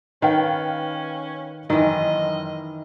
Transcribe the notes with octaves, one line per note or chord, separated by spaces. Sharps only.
D#3 C#4 B4 F5 G5
F#1 D#3 E3 D#5